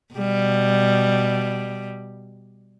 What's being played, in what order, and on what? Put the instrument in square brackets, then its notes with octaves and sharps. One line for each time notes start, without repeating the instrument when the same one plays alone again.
[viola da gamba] B2 G3